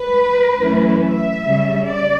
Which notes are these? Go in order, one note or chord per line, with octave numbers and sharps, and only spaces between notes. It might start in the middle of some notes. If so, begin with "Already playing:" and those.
Already playing: B4
F#2 E3 A3 C#4 E4
E5
C#3 G3 C#4
D5